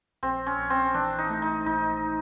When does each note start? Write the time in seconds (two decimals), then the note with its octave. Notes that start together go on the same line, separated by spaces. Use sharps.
0.23 A#1 C4
0.46 C#4
0.59 A#1
0.70 C4
0.94 E3 D4
1.18 D#4
1.30 A3
1.42 D#4
1.66 A#1 D#4